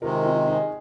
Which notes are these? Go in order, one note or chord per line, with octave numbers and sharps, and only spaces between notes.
C3 D#3 G#3 F4 A#4
C4 F4
D#4 G#4